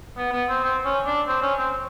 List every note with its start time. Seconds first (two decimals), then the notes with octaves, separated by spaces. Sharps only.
0.17 B3
0.32 B3
0.48 C4
0.64 C4
0.85 C#4
1.05 D4
1.27 C4
1.42 C#4
1.58 C4